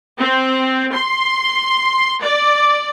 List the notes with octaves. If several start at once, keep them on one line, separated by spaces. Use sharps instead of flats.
C4
C6
D5